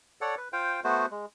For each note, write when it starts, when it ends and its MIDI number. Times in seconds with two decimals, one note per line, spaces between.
0.21 0.35 69
0.21 0.35 73
0.21 0.35 74
0.21 0.35 78
0.37 0.49 71
0.53 0.80 65
0.53 0.80 72
0.53 0.80 77
0.53 0.80 79
0.84 1.06 57
0.84 1.06 59
0.84 1.06 66
0.84 1.06 72
1.11 1.26 56